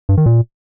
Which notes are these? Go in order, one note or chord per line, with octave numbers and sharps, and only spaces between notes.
G2
D#3
A#2